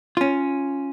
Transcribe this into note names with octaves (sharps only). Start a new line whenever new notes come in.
C#4 F4